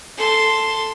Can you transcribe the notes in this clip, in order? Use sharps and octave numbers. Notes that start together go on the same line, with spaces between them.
A4 C6